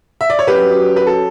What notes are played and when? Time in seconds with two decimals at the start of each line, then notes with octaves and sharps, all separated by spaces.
0.21 E5
0.30 D5
0.39 C#5
0.47 F#3 C#4 F#4 G4 B4
0.96 B4
1.07 A4